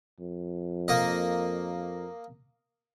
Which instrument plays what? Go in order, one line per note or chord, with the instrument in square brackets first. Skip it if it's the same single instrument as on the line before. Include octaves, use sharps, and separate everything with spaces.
[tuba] F2
[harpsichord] A#3 D#5